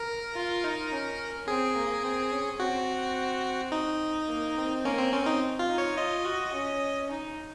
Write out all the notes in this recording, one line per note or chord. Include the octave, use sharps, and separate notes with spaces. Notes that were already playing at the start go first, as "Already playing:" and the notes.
Already playing: A#4
F4
D#4
C#4
C4 G#4
A#3
C4
C#4
C4 F#4
D#4
A#3
C4
A#3 C#4
C4
C4 C#4
D#4
F4
D#4
C#5
F4 D#5
F#4
C#4
D#4